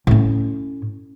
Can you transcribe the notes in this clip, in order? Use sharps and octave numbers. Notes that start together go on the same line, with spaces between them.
A2 C#4